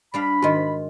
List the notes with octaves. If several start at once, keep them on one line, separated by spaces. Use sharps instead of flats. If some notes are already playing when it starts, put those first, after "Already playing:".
G3 D4 F5 B5
G#2 D#3 F#4 D#5